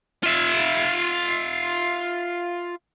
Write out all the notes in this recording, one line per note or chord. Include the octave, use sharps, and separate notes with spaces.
F4 E5